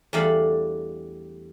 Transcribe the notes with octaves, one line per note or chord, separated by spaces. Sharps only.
E2 G3 A3 D4 F5 B5